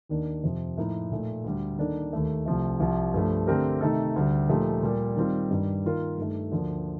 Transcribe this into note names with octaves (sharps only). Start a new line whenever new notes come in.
D#2 D#3 A#3 D4
F2 C3 F3
A2 F3 A#3 D#4 A#4
A#2 A3 D#4
D2 D3 G3
D#3 A#3 D4 A4
D#2 D#3 A3
C2 C3 F3 A3
C2 C3 F3
G2 F3 A3
D3 A3 C4 G4 A#4
C3 D#3 A3 D#4 A4
D2 D3 G3
A#2 F3 A3 D#4 G4
A#2 G3 A#3
D#3 G3 C4 F4
G2 D#3 G3
D#3 A#3 F4 A#4
G2 D#3 A3
D2 D3 F3 A#3 D4